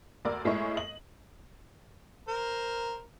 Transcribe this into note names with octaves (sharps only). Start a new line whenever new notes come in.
D2 A#4 D5 E6
A2 G#3 E4 A#4 C#5 C#6
D#5 F#7
A#4 C5